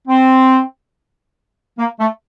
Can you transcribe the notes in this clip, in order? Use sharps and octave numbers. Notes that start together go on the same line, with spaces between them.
C4
A#3
A3